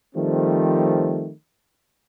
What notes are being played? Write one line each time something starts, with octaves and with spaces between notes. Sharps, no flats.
D#3 F3 G3 A3 C4